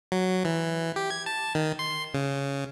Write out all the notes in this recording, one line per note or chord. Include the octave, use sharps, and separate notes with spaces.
F#3
E3
G4
G#6
A5
D#3
C6
C#3